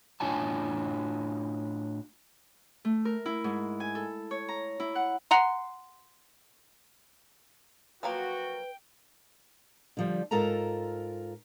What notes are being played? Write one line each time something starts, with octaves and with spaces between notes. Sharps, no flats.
A2 D4 F4 C#5 G#5 A5
A3
A#4
E4
G#2
G#5
A4
C#5
A#5
E4
F#5
F#5 A#5 C6
F3 F#3 A#3 F#4 B4 G5
D3 F3 G3
G#2 F4 A4 A#4 A5 A#5